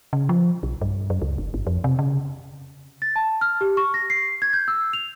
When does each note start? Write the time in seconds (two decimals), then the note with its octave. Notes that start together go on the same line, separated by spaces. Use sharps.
0.13 C#3
0.29 F3
0.63 B1
0.81 G2
1.10 F#2
1.22 C#2
1.38 F#1
1.54 G#1
1.67 F2
1.84 C3
1.99 C#3
3.02 A6
3.16 A5
3.41 F6
3.61 G4
3.77 C#6
3.94 A#6
4.10 C7
4.42 G#6
4.53 G6
4.68 E6
4.93 F7